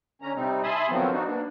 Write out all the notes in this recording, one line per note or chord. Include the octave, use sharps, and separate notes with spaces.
D3 C#4 A#5
C3 G3 C4 D#4
E5 G#5 A5 B5 C6 D#6
D3 D#3 F3 F#3 B3 C4
F3 D4 D#4 F#4
A#3 B3 D4